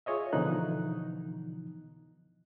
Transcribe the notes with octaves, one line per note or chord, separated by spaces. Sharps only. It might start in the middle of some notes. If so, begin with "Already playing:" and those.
F4 G#4 C#5 D#5 E5
B2 D3 E3 F3 D#4 F#6